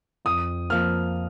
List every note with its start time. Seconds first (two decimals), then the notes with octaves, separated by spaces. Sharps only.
0.25 F2 D#6
0.70 F3 A#3 F6